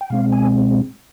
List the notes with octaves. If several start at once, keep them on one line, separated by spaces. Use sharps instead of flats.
G5
B2 G#3 C4 F5
G#5